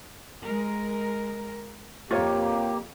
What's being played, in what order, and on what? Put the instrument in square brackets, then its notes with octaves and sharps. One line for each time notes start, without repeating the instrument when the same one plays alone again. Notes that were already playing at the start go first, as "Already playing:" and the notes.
[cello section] G#3 A#4
[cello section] F2 [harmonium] A#3 G4 [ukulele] F4 C#5